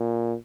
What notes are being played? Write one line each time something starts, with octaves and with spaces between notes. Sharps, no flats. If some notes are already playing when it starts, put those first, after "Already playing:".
Already playing: A#2